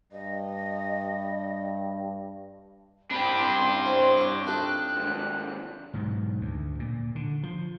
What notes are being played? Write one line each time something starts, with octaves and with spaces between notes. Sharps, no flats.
G2 D#5
C2 C3 D4 G4 B5
C6
C4 C#5
C#5 C#6
D#4 F4 A4 F#6
D#2 G#2
G#2 B2 F#3
D2
A#2
D3
F3